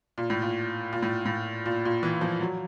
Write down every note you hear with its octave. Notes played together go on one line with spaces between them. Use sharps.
A#2
A2
A#2
A#2
A2
A2
A#2
A#2
E3
F3
F#3